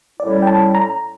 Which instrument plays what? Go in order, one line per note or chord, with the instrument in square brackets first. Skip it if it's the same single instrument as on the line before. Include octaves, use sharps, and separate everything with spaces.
[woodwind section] A2 G3 C#4 E4 [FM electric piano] D5
[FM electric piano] G5
A5
A#5